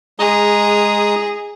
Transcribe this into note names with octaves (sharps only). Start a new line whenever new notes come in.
G#3 G#4 A#5 D#6